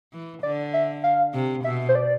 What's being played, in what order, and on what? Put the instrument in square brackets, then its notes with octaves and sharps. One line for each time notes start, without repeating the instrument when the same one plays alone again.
[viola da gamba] E3
[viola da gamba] D3 [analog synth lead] D5
[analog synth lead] E5
F5
[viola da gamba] C3
[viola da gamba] B2 [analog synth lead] E5
[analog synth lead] C5
D5